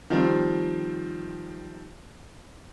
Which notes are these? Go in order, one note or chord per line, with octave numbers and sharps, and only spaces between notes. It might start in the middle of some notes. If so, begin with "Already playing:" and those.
D#3 F3 G3 C4